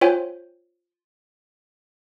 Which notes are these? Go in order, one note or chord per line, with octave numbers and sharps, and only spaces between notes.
F4 C5 C#5 G5 G#5